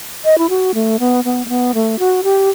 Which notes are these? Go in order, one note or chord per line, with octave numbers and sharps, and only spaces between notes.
D#5
E4
F#4
A3
B3
B3
A3
B3
A3
F#4
G4